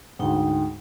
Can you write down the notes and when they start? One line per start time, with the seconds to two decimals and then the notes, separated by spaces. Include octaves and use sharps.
0.19 D2 G#2 G#3 D#4 G5